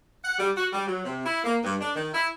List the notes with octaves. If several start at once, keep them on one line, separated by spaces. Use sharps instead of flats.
F#5
G3
F#4
G3
F#3
C3
E4
A#3
G2
D4
D#3
E4